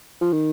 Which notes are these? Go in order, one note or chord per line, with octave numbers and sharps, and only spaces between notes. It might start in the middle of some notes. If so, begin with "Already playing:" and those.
F3
D#3